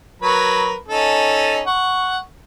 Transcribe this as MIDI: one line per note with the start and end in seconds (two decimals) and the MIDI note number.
0.22 0.75 54
0.22 0.75 70
0.22 0.75 71
0.88 1.61 61
0.88 1.61 63
0.88 1.61 69
1.67 2.18 78
1.67 2.18 85